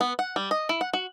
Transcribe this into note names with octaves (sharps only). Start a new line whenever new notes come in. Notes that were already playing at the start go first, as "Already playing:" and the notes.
B3
F#5
G3
D#5
E4
F#5
F#4